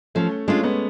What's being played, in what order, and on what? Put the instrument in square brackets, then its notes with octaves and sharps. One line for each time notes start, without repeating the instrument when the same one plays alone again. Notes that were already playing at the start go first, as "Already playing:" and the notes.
[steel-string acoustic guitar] F3 [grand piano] A3 C#4
[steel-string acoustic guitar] G#3 D4 F4 [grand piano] A3 C#4
[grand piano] G#3 B3